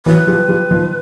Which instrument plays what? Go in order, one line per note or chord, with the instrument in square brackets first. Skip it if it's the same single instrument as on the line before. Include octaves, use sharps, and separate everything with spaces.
[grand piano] E3 F#3 [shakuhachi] B4
[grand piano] F3 G3
F3 G3
D#3 F3